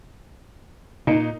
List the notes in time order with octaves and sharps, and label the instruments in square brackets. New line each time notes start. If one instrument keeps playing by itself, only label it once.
[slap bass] A#2 [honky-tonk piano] D#4